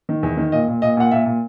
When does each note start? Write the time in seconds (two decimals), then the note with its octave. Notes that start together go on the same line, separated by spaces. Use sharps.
0.09 D#3
0.23 E2
0.37 D#3
0.52 A#2 D#5
0.68 A#2
0.82 A#2 D#5
0.97 A#2 F#5
1.11 A#2 E5
1.26 A#2